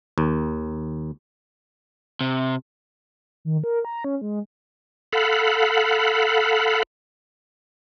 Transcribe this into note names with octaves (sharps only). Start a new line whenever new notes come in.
D#2
C3
D#3
A#4
A#5
C#4
G#3
A4 F5 F#5 B5